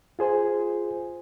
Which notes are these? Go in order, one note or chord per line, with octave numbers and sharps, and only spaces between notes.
F4 G#4 C5 G#5